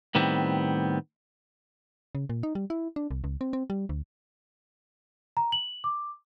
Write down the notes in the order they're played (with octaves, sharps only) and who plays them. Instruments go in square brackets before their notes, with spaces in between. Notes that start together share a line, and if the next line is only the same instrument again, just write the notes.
[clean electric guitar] A2 D#3 G3 B3 C4
[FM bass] C#3
A#2
D#4
G3
E4
D4
C2
C#2
C4
C4
G3
D2
[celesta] A#5
F#7
D6